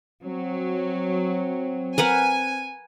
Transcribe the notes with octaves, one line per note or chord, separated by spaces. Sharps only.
F#3 C4
A#4 B4 F#5 G#5